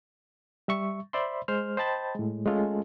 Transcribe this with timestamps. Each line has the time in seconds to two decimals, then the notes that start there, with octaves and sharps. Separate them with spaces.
0.68 G3 E5 C#6
1.13 C5 D5 E5 B5 C6
1.48 G#3 C5 F6
1.77 C5 D#5 G5 A5 B5 A6
2.15 A2 G#3
2.46 G#3 A3 C#4 F4 A4